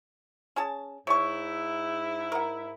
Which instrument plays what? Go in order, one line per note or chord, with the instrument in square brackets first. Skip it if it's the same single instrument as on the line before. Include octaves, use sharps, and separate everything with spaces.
[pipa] C#4 G#4 A5
[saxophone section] G#2 E4 [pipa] C#5 C#6
[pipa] A#4 F#5